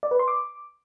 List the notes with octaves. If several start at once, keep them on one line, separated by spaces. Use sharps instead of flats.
D5
B4
C6
D6